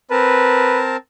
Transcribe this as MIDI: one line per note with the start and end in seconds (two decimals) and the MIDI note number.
0.11 0.97 60
0.11 0.97 70
0.11 0.82 71
0.11 0.97 81